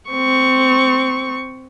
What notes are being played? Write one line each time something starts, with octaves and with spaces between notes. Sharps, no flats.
C4 C#6